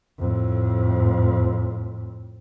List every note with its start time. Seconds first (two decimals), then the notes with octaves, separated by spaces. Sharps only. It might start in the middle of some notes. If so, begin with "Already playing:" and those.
0.19 F2 A2